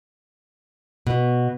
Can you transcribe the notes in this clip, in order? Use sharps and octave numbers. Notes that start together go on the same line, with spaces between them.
B2